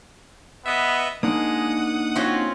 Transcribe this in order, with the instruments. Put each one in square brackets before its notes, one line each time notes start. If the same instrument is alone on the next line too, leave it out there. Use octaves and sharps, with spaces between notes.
[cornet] B3 [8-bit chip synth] B4 D#5 E5
[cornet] G#3 [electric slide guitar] A#3 D4 D#4 [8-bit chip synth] F#5 D#6
[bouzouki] C4 C#4 F4 [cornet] F#4